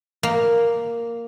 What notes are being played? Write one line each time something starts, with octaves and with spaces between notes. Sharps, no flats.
A#3